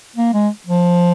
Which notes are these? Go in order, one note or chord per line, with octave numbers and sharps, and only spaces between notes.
A#3
G#3
F3